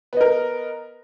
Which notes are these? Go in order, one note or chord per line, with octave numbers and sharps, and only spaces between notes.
B3 A#4 D#5